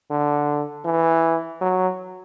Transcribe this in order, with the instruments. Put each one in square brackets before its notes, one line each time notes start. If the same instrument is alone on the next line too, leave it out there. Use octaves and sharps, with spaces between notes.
[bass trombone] D3
E3
F#3